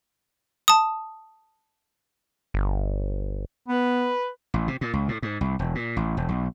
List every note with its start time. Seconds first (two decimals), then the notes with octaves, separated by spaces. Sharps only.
0.68 A5 D#6
2.54 G1
3.68 B3 B4
4.54 A1
4.68 C3
4.81 A#2
4.93 C#2
5.09 A2
5.23 G#2
5.41 C2
5.59 E1
5.75 A#2
5.97 A1
6.17 E1
6.29 B1